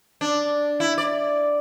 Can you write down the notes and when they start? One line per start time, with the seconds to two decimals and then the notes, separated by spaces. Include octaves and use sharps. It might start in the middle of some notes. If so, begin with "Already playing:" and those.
0.21 D4
0.80 E4
0.98 D5